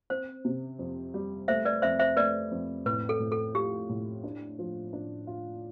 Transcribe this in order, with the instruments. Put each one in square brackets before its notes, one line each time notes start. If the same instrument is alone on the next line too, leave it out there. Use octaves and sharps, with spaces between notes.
[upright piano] C4 [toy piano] C5
[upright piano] C3
F2
G3
[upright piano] A3 [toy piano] C5 E5
[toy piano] B4 D5
[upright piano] F2 [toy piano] C5 E5
[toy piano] C5 E5
[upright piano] A3 [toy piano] B4 D5
[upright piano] F2
[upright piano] A2 [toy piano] B4
[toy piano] A4
[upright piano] A2
[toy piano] A4
[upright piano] F4 [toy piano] G4
[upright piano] A2
D4
F3
D4
F4